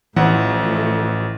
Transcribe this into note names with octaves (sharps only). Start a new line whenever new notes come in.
A1 A2 E3 F3 A3 C4 F#5